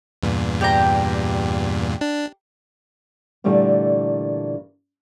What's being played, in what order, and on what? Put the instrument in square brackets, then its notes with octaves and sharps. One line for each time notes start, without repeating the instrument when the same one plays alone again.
[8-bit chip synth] E2 G2 A#2
[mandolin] G4 D5 A#5
[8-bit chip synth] D4
[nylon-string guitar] A#2 D3 E3 G3 A3 A#3